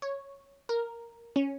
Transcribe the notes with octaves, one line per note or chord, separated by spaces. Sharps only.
C#5
A#4
C#4